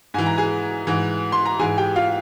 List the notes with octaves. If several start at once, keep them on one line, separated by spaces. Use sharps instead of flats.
G#2 E3 G#5
A#5
G#4 G#5
G#2 E3
C6
A#5
G#2 E3 G#4 G#5
G4 G5
F4 F5